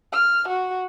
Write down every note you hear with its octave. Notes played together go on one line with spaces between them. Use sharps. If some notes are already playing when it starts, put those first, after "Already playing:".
F6
F#4